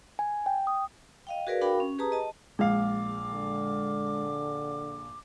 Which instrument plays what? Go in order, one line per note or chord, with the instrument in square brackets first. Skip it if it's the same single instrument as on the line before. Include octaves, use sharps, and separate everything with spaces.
[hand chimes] G#5
G5
D#6
[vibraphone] D#5 F5 G5
F#4 G#4 A#4 B4 D5 F5
D4 F#4 A#4 F5 G5 B5
C#4
G4 G#4 B4 A5 A#5 D#6
D#5 A5
[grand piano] A#1 F5 [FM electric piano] G#3 [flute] D6
[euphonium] D3